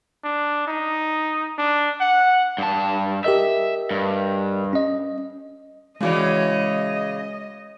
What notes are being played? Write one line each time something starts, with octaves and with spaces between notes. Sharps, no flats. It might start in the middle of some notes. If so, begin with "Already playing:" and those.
D4
D#4
D4
F#5
G2 A5
G4 A#4 D#5 E5
G2
C#4 D#5
C#3 E3 G#3 C#4 F#4 D5 D#5